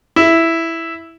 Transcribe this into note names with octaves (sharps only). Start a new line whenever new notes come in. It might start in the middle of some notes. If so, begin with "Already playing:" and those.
E4